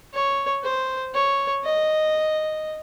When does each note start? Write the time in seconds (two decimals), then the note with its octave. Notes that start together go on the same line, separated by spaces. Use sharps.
0.13 C#5
0.64 C5
1.14 C#5
1.64 D#5